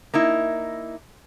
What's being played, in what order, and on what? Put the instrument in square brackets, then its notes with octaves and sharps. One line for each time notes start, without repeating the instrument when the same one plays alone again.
[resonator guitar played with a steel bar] A#3 D#4 E4